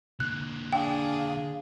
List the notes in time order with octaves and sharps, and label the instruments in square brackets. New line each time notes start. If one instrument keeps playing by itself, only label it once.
[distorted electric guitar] D3 A#3 [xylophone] F#6
[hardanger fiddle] D4 G#4 [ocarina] F5 [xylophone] G5